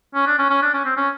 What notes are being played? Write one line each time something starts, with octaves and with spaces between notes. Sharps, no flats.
C#4
D4
C#4
C#4
D4
C#4
C4
C#4